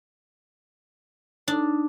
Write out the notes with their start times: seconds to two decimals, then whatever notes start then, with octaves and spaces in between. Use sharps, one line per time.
1.48 D4 D#4